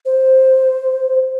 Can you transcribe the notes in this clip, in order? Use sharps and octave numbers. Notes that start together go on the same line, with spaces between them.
C5